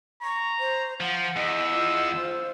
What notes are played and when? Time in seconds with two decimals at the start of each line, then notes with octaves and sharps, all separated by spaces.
0.23 A#5 C#6
0.60 C5
1.00 F3 F#5
1.36 E2 D#5 E6
1.72 F4 D#5 F5
2.17 C5 F5